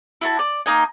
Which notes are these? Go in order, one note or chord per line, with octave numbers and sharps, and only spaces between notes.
E4 F#4 A5
D5
A#3 D#4 D#5 G#5